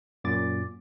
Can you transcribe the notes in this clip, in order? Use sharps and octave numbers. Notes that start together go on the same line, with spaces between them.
F#2 A#2 D6 A6